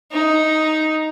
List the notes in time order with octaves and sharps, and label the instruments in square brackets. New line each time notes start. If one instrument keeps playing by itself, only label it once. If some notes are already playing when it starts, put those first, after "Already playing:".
[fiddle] D#4